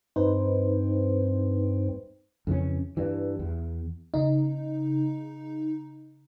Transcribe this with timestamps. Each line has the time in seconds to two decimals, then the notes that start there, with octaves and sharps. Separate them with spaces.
0.16 G2 C4 D#4 B4 C5
2.47 F2 C#3 E3 C#4
2.97 G2 E3
3.39 E2
4.14 C#3 D#4